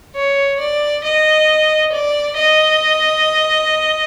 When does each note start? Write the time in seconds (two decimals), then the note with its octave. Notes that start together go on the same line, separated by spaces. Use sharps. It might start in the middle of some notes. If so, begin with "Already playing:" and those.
0.15 C#5
0.60 D5
1.04 D#5
1.92 D5
2.37 D#5